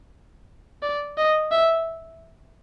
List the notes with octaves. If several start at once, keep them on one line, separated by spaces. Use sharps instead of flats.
D5
D#5
E5